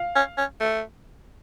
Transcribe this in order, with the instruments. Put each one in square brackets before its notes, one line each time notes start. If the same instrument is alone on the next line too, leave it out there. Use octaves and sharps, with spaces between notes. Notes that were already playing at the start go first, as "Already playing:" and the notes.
Already playing: [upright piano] F5
[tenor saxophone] C#4
C#4
A3